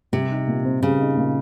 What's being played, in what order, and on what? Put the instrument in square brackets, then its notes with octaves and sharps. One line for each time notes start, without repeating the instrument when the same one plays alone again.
[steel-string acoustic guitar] C3 [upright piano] G3
[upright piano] D#4
A#2
C4
[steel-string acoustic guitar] C#3 [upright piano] G3
[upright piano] D#4
A#2